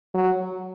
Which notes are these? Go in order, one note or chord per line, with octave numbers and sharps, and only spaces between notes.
F#3